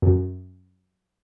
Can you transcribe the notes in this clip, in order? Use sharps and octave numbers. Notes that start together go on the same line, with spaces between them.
F#2